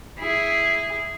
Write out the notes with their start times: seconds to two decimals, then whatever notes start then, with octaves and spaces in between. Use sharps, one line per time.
0.20 E4 G#4